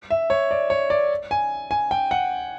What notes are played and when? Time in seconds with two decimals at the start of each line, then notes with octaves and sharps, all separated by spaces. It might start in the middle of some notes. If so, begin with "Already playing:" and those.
0.11 E5
0.30 C#5
0.51 D5
0.70 C#5
0.90 D5
1.31 G#5
1.71 G#5
1.91 G5
2.11 F#5